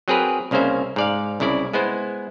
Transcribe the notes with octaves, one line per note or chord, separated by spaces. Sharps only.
F#3 C4 G#4 A#4 B4
C2 C#3 A#3 C#4 C5 E5
G#2 D5 F5
C2 C#3 E4 D5
G#3 B3 E4 C5